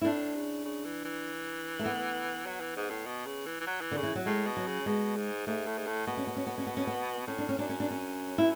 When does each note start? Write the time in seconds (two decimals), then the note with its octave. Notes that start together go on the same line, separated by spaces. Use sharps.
0.01 E4
0.05 A2 D4
0.35 C#3
0.65 C#3
0.85 E3
1.05 E3
1.79 A3
1.86 B3
2.46 F#3
2.61 E3
2.76 G#2
2.90 A2
3.06 B2
3.26 C#3
3.46 E3
3.60 E3
3.67 F#3
3.81 E3
3.91 D3
3.97 C#3
4.03 E3
4.15 F#3
4.26 A2 G#3
4.47 B2
4.57 F#3
4.67 C#3
4.86 B2 G#3
5.17 G#2
5.47 G#2 A3
5.67 A2
5.78 G#2
5.87 A2
6.07 B2 B3
6.17 C#4
6.27 B3
6.37 C#4
6.47 B3
6.58 C#4
6.67 B3
6.77 C#4
6.87 B3
7.27 A2 C#4
7.38 D4
7.49 C#4
7.57 F#2 D4
7.69 C#4
7.80 D4
7.91 C#4
8.38 E4